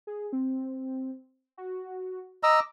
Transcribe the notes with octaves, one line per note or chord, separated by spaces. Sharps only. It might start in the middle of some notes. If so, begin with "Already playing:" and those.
G#4
C4
F#4
D#5 A#5 D6 E6